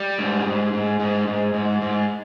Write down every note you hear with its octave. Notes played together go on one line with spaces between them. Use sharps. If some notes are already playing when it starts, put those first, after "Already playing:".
Already playing: G3
G#2
G#2
G#2
G#2
G#2
G#2
G#2